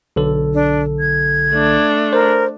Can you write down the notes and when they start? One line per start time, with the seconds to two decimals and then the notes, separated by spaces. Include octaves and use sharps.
0.16 B1 D3 A4
0.54 D4
1.00 G#6
1.52 A3 D4
2.13 A#4 C5